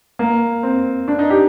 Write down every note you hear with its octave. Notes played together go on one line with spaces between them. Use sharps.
A#3
C4
D4
D#4
G4